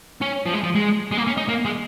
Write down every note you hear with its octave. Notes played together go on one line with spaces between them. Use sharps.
C#4
F3
G#3
F3
G#3
G#3
A#3
C#4
D#4
A#3
G#3